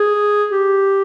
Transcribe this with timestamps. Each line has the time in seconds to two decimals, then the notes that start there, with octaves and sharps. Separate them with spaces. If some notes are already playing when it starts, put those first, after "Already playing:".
Already playing: G#4
0.52 G4